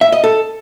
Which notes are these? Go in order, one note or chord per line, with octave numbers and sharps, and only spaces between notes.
E5
D#5
A4